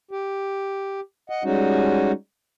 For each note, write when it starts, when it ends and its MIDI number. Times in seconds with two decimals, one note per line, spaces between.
0.11 1.00 67
1.30 1.43 75
1.30 1.43 78
1.44 2.12 55
1.44 2.12 56
1.44 2.12 61
1.44 2.12 63
1.44 2.12 66